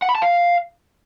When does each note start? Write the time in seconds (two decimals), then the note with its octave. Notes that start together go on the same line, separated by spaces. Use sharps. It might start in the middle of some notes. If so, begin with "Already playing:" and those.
0.02 F#5
0.09 B5
0.15 A5
0.22 F5